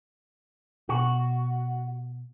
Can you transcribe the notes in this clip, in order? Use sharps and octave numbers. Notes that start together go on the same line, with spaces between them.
B2 F#4